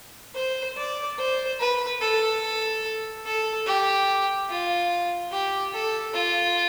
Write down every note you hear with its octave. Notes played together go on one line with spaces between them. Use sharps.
C5
D5
C5
B4
A4
A4
G4
F4
G4
A4
F4